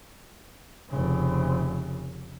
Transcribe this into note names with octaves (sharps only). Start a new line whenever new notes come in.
F1 C#3